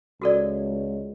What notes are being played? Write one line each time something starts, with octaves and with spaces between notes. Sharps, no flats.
C#2 F#4 A4 D5